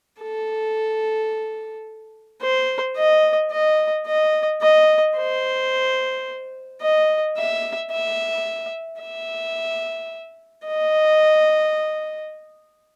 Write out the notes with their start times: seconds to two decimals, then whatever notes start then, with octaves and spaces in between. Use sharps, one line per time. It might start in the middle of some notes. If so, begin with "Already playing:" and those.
0.22 A4
2.42 C5
2.97 D#5
3.52 D#5
4.07 D#5
4.62 D#5
5.17 C5
6.82 D#5
7.37 E5
7.92 E5
9.01 E5
10.67 D#5